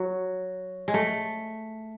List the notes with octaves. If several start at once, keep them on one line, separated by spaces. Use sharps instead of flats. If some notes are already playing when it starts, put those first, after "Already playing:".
Already playing: F#3
G#3
A3